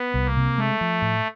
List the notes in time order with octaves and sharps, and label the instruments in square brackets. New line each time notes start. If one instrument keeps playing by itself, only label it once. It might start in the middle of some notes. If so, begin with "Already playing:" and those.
Already playing: [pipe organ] B3
[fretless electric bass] C2
[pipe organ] A#3
[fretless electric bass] C3
[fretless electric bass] G#3 [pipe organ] A3
[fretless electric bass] F3
A2